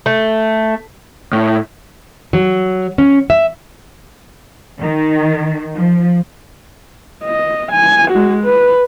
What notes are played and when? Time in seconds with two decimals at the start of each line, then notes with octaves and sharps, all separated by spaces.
0.06 A3
1.33 A2
2.33 F#3
2.98 C#4
3.30 E5
4.80 D#3
5.76 F3
7.25 D#5
7.72 G#5
8.11 G#3 F#4
8.44 B4